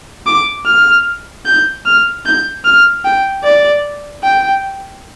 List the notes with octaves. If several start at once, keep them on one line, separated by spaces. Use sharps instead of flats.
D6
F6
G6
F6
G6
F6
G5
D5
G5